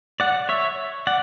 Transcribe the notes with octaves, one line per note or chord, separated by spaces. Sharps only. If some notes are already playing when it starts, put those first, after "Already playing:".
D5 F#5
C#5 E5
D5 F#5